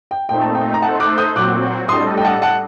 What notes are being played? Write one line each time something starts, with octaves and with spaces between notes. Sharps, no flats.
G5
A#2 A3 C4 D#4 G5
A5
G5
A#5
A3 D#4 A4 C5 F#5 A5
D6 F#6
D#6 G6
A#2 F#3 C4 F#4 D6 F#6
A2 G3 D4 A4 D#5 C6 D#6
G5
F#5 A5
F#5 A5